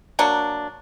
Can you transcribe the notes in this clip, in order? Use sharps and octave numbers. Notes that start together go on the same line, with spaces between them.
F#3 A#3 D4